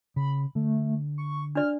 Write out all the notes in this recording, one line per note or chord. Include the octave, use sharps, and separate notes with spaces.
C#3 B5
D3 A3
C#6
D4 D5 F6